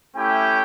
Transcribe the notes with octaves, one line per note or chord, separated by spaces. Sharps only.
A3 C#4 E4 G4 G5